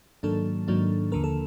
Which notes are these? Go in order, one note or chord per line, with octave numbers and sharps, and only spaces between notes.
G#2 D#3 F#3 A#3 D4 A4
G#2 D#3 F#3 A#3 D4
D#2 D3 F3 A#3 A#4
A4